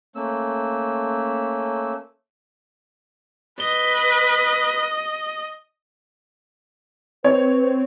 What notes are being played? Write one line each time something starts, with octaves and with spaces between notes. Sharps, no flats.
A3 A#3 C#4 E6
B4 D#5 G7
C4 B4 C#5